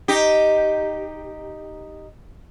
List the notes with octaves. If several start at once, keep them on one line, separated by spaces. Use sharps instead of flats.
D#4 G4